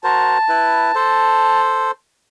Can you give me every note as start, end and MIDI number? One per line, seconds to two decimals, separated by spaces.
0.04 0.38 66
0.04 0.38 70
0.04 0.38 72
0.04 1.60 81
0.49 0.91 64
0.49 0.91 71
0.95 1.91 69
0.95 1.91 72